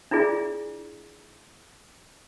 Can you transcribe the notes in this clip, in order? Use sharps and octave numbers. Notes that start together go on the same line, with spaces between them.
D4 E4 F4 G#4 D5